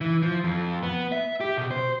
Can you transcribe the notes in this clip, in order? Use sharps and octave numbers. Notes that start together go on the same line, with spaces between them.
E3
F3
F2
B3
E5
G4
B2
C5